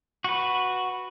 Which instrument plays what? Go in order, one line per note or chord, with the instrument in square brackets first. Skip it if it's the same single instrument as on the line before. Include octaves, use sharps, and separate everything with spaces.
[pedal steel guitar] F#4 B4